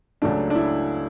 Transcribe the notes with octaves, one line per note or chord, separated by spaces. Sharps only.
C#2 C#3 F#3 A3 D4
D4
E4